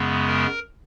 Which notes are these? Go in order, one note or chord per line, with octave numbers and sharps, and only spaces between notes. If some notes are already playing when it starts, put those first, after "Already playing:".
Already playing: F#2 C#3 G#3 B3
A#4